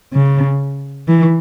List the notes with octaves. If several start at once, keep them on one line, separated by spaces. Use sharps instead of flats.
C#3
E3